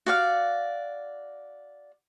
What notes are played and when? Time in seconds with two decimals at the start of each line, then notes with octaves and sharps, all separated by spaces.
0.06 F#4 D5 F5